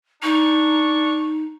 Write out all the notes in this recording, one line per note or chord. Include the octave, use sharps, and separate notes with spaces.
D4 D#4 C#6